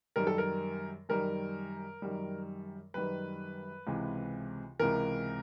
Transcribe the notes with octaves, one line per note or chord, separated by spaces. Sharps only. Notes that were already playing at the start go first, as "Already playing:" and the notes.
F#2 D#3 G3 A#4
A4
A#4
F#2 D#3 G3 A#4
F#2 D#3 G3
F#2 D#3 G3 B4
C#2 C3 E3
C#2 C3 E3 A#4